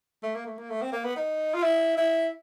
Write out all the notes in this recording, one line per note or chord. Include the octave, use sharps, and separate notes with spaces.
A3
A#3
A3
A#3
A3
C4
A#3
B3
D#4
F4
E4
E4